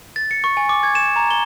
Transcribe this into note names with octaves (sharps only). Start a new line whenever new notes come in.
A6
C#7
C#6
G#5
D6
G#6
E7
A#5
G7